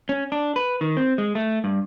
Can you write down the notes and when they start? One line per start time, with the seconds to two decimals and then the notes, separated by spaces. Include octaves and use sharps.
0.09 C#4
0.32 D4
0.56 B4
0.81 D#3
0.97 C4
1.18 G#3
1.35 A3
1.64 G2